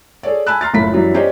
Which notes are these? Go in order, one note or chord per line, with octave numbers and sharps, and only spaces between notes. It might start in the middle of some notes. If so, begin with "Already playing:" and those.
G#4 A4 C#5 D5
G#5 A5 B5 E6 F#6
A#5 C6 F6 A6
F#1 A2 E4 F4 B5 B6
F#2 E3 F#3 G3
C#4 G4 C5 D5 D#5